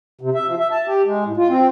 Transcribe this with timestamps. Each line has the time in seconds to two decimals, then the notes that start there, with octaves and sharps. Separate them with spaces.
0.21 C3
0.34 E5
0.47 F3
0.59 E5
0.71 A5
0.87 G4
1.05 G#3
1.25 A2
1.37 F4
1.49 C4